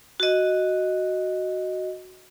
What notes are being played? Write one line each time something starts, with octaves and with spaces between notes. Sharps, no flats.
F#4 D#5